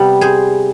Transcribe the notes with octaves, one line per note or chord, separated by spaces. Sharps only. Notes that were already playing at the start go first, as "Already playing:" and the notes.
Already playing: C3 G3 B3 D5
G#4 C5